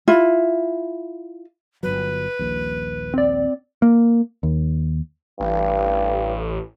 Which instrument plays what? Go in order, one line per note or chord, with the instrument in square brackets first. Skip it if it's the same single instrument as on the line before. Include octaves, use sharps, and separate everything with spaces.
[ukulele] E4 F4
[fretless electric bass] G1 C#2 F#3 [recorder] B4
[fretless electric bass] D#1 A#1
[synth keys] C4 D5
[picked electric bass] A#3
D#2
[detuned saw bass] A1 [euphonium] G2